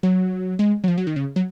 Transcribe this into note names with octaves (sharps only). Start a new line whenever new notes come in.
F#3
G#3
F#3
F3
F#3
D#3
C#3
F#3